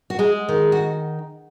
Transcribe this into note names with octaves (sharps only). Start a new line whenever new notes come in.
F#4
G#3 G#4
D#3
F#4